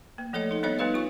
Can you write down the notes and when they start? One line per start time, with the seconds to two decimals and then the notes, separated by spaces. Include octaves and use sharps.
0.18 A#3
0.33 F3 A3 A4 C#5 D#5
0.51 D#4 A4
0.63 G3 B3 D4 C5 C#5 D#5
0.79 G3 B3 D#4 G4 B4 F5
0.94 F4 C#6